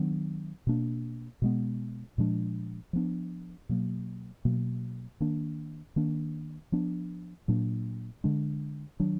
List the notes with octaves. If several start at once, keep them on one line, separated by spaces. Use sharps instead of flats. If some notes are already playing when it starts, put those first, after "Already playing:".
Already playing: D#3 F#3 B3 D4
B2 A#3 D4
B2 G#3 B3
A#2 F3 G#3 D4
F3 B3 D4
B2 F#3 A#3
B2 F#3 A#3
D#3 A#3 D4
D#3 A#3 D4
F3 B3 D4
A#2 F#3 A#3 D4
D3 G#3 D4
D#3 F#3 D4